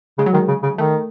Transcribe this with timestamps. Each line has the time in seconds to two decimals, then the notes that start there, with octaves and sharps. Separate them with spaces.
0.18 C#3 G#3
0.26 F#3
0.33 D#3 G#3
0.48 C#3
0.63 C#3
0.78 D#3 A3